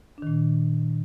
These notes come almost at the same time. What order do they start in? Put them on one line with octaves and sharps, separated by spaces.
D4 D#3 A#2